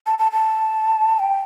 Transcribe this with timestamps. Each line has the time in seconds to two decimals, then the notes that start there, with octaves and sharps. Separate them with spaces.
0.06 A5
0.19 A5
0.32 A5
1.19 G5